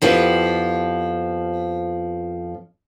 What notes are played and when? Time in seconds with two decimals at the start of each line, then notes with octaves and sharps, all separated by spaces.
0.02 F2 F3 B3 E4 G4